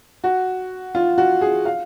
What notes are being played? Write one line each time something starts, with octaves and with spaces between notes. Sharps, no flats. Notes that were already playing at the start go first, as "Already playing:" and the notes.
F#4
F4
F#4
G#4
F5